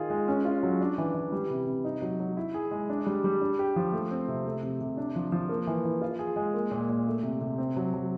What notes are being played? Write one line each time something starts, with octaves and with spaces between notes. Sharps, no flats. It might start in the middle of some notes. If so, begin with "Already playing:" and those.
Already playing: D#3 F4 G#4
G#3
C#4
F4
F#3
D4
E3
E3
G3
C3
C3
D#4
F#3
F#3
E4
G#4
G#3
D4
G3
G3
D4
G4
F3
A3
C4
C3
A3
C3
C3
D4
F3
F3
A#3
E3
E3
F4
G#4
G#3
A#3
A#2
A#2
A3
C3
C3
C4
F#3
F#3